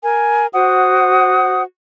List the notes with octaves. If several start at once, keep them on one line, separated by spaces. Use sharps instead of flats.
A#4 G#5
F#4 C5 F#5 D#6